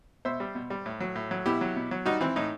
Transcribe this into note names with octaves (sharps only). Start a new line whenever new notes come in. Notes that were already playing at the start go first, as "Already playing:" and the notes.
B2 C5 E5
G3
B2
G3
A2
F#3
A2
F#3
B2 E4 G4
F#3
B2
F#3
G3 D#4 F#4
E3 C4 E4
A2 D#4